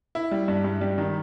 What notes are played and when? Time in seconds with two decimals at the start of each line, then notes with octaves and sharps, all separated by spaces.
0.15 E4
0.31 G3
0.48 G2
0.64 G2
0.81 G3
0.98 D#3